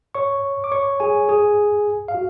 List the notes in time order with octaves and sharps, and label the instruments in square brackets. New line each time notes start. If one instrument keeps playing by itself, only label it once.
[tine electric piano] C#5 C#6
D6
C#5 C#6
G#4 G#5
G#4 G#5
F5
F#4